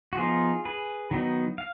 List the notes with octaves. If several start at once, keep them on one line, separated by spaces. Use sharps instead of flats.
F#4
F3 B3 D#4 F4 G#4
G#4 B4
D#3 F#3 B3 D#4
F5